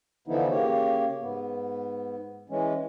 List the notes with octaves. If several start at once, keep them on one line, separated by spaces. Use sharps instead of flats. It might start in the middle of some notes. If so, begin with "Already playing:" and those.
D3 E3 F3 B3 D#4 E4
C#3 A#3 G4 C#5
G#2 B3
E3 G#3 C#4